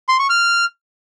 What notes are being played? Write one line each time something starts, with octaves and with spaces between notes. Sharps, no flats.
C6
C#6
F6